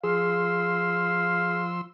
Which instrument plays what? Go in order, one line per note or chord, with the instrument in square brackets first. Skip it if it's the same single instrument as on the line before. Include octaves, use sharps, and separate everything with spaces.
[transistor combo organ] F3 C6 E6 [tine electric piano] G#4 [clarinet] F5